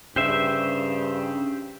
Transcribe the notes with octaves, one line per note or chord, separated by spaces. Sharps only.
G2 C#3 G4 C5 E5